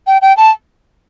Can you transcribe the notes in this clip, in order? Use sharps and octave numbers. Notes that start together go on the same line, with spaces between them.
G5
G5
A5